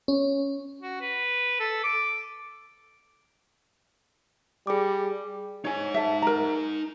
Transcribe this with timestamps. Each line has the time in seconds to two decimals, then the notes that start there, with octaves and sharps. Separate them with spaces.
0.08 C#4
0.81 F#4
1.01 B4
1.60 A4
1.84 D6
4.67 G3 G#4 D6
5.65 D#4 C#5 G#5
5.94 A4 E5
6.22 A#4 A#5